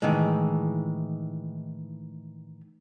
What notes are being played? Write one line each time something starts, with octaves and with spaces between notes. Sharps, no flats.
A2 D#3 E3 G#3